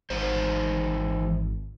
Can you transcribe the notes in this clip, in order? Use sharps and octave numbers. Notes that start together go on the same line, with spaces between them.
G#1 E3 D#4 C5